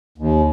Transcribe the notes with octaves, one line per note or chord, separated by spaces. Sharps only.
D#2